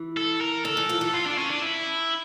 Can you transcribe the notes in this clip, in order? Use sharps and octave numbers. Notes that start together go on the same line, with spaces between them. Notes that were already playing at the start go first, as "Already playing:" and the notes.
Already playing: E3
A4
A#4
D3 A4
E3
F3
E3
F4
D4
C#4
D4
E4